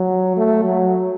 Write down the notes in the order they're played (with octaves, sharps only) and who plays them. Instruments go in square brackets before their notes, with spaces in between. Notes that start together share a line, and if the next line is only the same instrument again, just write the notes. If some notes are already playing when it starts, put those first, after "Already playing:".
Already playing: [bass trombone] F#3
A3
F#3